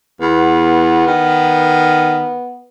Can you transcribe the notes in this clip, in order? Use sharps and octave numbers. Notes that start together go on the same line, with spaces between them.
E2 B3
D#3